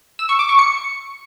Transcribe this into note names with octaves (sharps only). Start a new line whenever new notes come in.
E6
C#6
D6
C#6
C#7